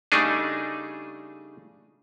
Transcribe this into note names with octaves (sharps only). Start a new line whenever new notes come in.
C#3 G3 A3 D4 D#4 G#4